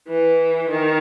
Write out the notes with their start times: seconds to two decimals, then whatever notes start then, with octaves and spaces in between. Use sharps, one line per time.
0.09 E3
0.70 D#3